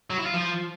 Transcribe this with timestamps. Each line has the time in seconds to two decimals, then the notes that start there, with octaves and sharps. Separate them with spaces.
0.10 F#3
0.18 E4
0.26 F4
0.34 F3